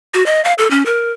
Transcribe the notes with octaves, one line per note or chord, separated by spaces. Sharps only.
F#4
D#5
F5
A4
C#4
A#4